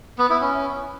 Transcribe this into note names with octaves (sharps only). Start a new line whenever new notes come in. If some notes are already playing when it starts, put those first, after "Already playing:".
B3
E4
C#4